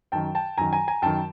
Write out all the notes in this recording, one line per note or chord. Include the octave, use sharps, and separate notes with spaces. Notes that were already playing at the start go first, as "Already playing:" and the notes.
F#2 D#3 G5 A5
G5 A5
F#2 D#3 G#5 A#5
G#5 A#5
G#5 A#5
F#2 D#3 G5 A5